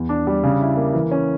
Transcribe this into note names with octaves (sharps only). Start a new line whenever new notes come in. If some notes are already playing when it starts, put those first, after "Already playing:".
Already playing: E2
D4
G3
C#3
E4
A#3
E3
C#4